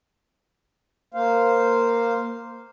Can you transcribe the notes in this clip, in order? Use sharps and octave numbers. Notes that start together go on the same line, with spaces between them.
A#3 C5 F5